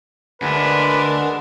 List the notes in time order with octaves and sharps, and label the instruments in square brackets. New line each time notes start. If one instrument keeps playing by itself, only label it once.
[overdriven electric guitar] D2 [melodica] G#3 F#5 [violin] D4 A#4 [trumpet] B4